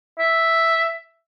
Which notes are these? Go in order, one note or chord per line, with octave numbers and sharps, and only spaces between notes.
E5